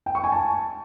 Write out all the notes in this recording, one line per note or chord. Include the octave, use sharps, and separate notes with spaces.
G5
C#6
G#5
A5